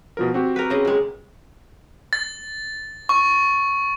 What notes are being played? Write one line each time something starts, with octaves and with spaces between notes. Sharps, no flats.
B2 F3 A#4
C4 F#4 G4
A#4 B4
C#3 D#5
A#2 G#3
A6
C#6